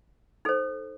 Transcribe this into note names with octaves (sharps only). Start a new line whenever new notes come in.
D#4 A4 C5